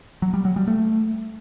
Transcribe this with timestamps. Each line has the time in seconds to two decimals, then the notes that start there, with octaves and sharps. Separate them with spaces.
0.22 F#3
0.34 G3
0.45 F#3
0.56 G3
0.68 A3